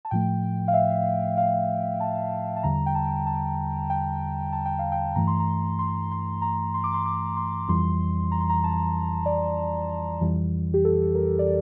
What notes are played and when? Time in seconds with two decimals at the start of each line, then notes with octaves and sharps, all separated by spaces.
0.05 A5
0.11 A2 F3 A3 G5
0.68 F5
0.74 E5
1.37 F5
2.00 A5
2.56 A5
2.63 E2 D3 G3 A#5
2.86 G5
2.95 A5
3.26 A5
3.90 G5
4.53 A5
4.65 G5
4.79 F5
4.92 G5
5.15 G2 E3 A3 A#5
5.27 C6
5.40 A#5
5.79 C6
6.11 C6
6.42 A#5
6.74 C6
6.84 D6
6.94 C6
7.06 D6
7.37 C6
7.68 F2 E3 G3 C6
8.32 A#5
8.41 C6
8.50 A#5
8.64 A5
9.26 D5
10.21 F2 E3 G3
10.74 G4
10.85 A4
11.15 A#4
11.39 D5